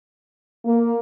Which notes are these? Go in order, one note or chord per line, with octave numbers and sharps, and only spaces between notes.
A#3